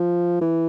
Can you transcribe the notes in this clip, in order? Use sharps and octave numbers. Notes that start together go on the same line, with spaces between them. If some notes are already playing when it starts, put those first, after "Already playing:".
Already playing: F3
E3